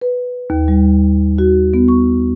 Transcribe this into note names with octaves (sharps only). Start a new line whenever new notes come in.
B4
D#2
G3
F#4
B3
C#6